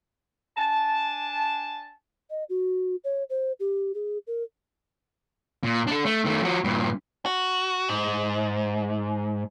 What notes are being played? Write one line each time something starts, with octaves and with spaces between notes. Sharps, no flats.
D4 G#5 A5
D#5
F#4
C#5
C5
G4
G#4
A#4
A#2
D4 A4
A3
D#3 A3
F3 F#4
G2 A#2
F#4
G#2